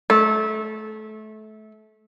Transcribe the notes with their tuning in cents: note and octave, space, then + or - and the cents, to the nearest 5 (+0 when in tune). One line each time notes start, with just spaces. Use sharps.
A3 -25